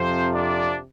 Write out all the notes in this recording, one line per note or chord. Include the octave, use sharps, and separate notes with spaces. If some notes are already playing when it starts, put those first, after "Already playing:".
Already playing: F2 C3 F3 C4 C5
D4 D5